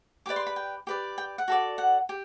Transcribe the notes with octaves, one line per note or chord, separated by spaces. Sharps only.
G4 B4 D5 D6
C6
B5
G5
G4 B4 D5
G5
F#5
F#4 A4 D5
F#5
G4